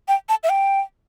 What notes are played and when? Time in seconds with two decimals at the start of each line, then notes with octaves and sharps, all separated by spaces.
0.08 G5
0.29 A5
0.43 E5
0.49 G5